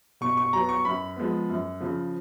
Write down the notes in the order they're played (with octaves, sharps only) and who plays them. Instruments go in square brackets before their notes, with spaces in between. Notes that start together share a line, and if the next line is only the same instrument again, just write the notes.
[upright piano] B2 C#6
C#6
F#3 B3 A#5
C#6
F#2 B5
F3 G#3 B3
F#2
C#3 F3